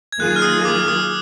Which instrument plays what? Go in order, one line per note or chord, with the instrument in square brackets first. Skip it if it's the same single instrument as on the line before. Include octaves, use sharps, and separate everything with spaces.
[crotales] G#6
[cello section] D#3 F#3 A#3 F4 G#4 [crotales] F#6
[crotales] F6
D#6
D6
D#6